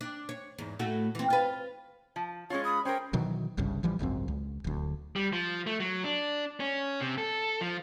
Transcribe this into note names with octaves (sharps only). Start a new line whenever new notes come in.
D4
C#5
E2 G#2
A2 A3 F#4
E3 C4
F4 B4
F3
G#3 C#4 F4 C#5
B5 D#6
C#4 A#4 C5 G5
B2 D#3 E3 F#3
G1 C2 G2 C#3
A1 E3 F3 G3
G#1 C#2 F#2 C4
C#2
D1 D2
G3
F3
A3
F#3
D4
C#4
C3
A4
F3